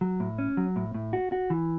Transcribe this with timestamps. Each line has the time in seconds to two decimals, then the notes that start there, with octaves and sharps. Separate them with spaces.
0.01 F#3
0.20 A2
0.38 C#4
0.57 F#3
0.76 A2
0.94 A2
1.13 F#4
1.32 F#4
1.50 E3